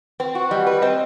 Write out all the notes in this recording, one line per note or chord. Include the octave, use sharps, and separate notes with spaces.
C4 B4
F#4
G3 D#5
B4
C4 D#5